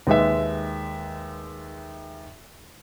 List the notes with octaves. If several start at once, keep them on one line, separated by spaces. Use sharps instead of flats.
D#2 G#3 B4 E5